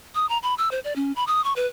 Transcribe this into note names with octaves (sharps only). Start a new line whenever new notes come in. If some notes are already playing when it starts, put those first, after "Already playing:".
D#6
A#5
B5
E6
C5
D5
C#4
B5
D#6
C#6
B4